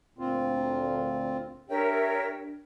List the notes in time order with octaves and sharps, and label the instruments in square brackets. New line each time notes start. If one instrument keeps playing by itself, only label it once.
[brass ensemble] D2 A#2 [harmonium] C4 F4
[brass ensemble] D4 G4 [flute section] A#4 C#5 E5 [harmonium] G5